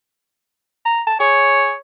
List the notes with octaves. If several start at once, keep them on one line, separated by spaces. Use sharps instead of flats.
A#5
A5
G#4 C#5